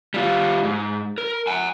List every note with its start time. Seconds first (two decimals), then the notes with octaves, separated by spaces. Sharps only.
0.14 G3 F4
0.63 G#2
1.18 A#4
1.47 F#5 G#5